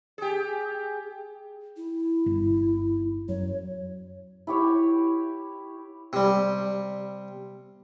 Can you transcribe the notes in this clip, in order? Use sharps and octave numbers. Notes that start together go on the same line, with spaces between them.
G4 G#4
E4
G1
F#2 C#5
E4 G4 C#5
C3 G3